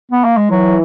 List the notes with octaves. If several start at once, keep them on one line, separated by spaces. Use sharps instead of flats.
B3
A#3
G#3
E3 F#3